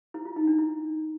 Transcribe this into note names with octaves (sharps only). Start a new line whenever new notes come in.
E4
F4
D#4
D4
E4